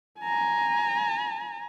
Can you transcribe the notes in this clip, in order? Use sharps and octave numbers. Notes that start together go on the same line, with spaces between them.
G#5 A#5